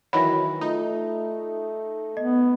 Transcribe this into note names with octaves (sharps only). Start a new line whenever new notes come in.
D#3 E3 F#3 B5 A#6
A3 D#4 F4
B3 D#5